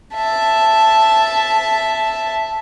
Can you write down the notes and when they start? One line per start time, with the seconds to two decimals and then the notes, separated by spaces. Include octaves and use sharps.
0.14 E5 A5